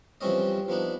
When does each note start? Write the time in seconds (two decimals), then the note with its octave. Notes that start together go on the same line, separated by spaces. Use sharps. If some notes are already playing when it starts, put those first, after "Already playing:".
0.21 E3 F3 G3 C4 C#4 D#5
0.68 F3 B3 D4 D#4